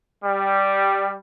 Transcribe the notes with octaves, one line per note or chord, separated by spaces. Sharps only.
G3